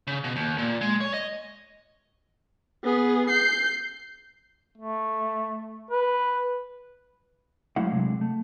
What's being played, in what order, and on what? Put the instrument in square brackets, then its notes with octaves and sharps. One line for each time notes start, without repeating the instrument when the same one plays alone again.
[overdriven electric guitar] C#3
B2
D#2
A#2
G#3
C#5
D#5
[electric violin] B3 G#4
G6 C7
[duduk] A3
B4
[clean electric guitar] F#3 G#3 A3 E4 F5 F#5
C3 F#3 G#3 D4
A3